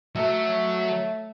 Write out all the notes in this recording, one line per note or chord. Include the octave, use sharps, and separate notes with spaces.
F#3 A3 E5